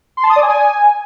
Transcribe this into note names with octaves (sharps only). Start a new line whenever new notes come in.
C6
A5
D#6
D5
G#5